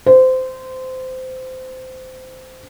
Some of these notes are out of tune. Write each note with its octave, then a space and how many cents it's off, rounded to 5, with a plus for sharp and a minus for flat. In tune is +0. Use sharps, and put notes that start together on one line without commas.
C5 -20